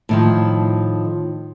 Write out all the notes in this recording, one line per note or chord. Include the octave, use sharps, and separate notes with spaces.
A2 D#3 F3